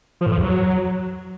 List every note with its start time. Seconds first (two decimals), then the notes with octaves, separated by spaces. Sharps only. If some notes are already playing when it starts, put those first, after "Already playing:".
0.21 F3
0.26 A2
0.32 F3
0.38 E2
0.43 F#3